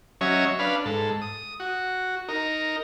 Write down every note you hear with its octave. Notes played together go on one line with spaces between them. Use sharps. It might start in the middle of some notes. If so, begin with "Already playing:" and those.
F#3 C#4 C#5 D#5 E5
D4 B4 F5
G#2 A4
D#6
F#4
D#4 A#4